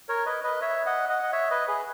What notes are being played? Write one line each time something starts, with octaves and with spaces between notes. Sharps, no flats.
A#4 C#5
B4 D#5
B4 D#5
C#5 E5
D#5 F#5
D#5 F#5
D#5
C#5 E5
B4 D#5
G#4 B4